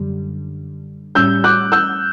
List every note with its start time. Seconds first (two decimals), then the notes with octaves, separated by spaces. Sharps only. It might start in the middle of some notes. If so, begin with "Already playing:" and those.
Already playing: F#2 D3 G3
1.15 A2 G3 C#4 E6 G6
1.44 D6 F#6
1.72 E6 G6